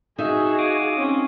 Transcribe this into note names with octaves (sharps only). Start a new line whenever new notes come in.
D#4 F#4 G#4 E5
F5 D6 D#6
C4 C#4